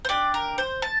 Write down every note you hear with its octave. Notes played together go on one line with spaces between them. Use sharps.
C5
D4 G4 D5
A#4
C5
A5